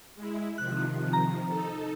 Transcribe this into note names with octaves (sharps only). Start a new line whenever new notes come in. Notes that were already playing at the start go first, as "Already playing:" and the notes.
G#3 E4
C3 D#3 F3 F#6
A#5
D#4 A4